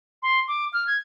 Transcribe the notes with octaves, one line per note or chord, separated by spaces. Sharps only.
C6
D6
F6
G#6